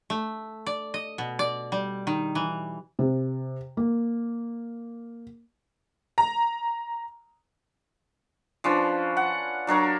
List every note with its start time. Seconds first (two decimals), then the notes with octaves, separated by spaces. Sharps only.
0.10 A3
0.67 D5
0.94 D#5
1.18 B2
1.39 D5
1.72 G3
2.07 D#3
2.35 E3
2.99 C3
3.77 A#3
6.18 A#5
8.64 F3 C#4 D4 B4
9.17 F#5
9.67 F#3 D4 A#4 C#5